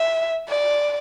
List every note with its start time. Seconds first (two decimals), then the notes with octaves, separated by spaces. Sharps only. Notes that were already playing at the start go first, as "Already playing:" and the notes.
Already playing: E5
0.48 D5